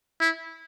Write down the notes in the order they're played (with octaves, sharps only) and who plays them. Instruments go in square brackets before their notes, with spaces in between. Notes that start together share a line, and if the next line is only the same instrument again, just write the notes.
[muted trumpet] E4